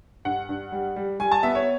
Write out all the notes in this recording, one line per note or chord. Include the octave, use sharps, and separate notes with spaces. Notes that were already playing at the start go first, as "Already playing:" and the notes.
G2 F#5
G2
G3
G3
G3 G#5
A5
B3 E5
C#5